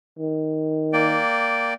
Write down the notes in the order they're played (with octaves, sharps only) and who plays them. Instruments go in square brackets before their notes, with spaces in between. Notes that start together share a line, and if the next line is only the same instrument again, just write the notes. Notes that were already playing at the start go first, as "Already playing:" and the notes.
[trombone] D#3
[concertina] A#3 D5 G5